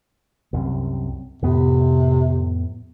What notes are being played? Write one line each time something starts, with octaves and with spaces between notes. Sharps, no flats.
C2 F#2 C3
F2 A2 C3 B3